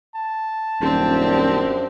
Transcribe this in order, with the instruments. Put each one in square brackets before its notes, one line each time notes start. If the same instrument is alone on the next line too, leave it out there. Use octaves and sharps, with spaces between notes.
[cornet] A5
[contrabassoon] D#1 [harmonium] F#2 F3 D4 [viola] C4 G4